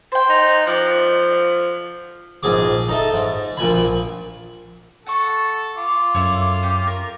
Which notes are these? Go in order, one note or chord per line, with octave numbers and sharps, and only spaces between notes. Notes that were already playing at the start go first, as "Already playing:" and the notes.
C5 G5
D#4
F3 D5 F5 F#5
A#1 G#2 G#4 D6
D#4 A4 E5
G#2
A#1 A#2 G#5 B5
A4 F#5 A5 C#6
F4 D6
F#2 E4 A4 C#5
C#4 G4
A#4